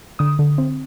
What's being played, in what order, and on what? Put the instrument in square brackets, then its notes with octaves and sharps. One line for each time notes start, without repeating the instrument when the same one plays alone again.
[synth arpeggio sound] D3 D#6
D3
C4